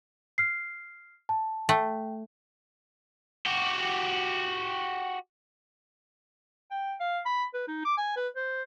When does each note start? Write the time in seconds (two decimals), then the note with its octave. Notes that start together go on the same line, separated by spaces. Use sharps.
0.38 F6 C7
1.29 A5
1.69 A3 G5
3.46 F#4 G4
6.71 G5
7.00 F5
7.26 B5
7.54 B4
7.68 D#4
7.85 D6
7.98 G#5
8.16 B4
8.36 C5